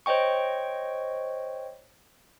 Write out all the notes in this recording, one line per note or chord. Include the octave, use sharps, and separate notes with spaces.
C5 C#5 D#5 G5 C#6